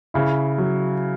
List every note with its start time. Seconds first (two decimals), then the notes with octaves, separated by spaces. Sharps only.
0.14 C#3 E4
0.58 F#3